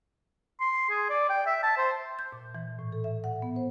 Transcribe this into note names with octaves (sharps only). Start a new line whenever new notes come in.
C6
G#4
D5
G5
E5
A5
C5
G6
A#2
E3
A2
A4
E5
F#5
B3
C5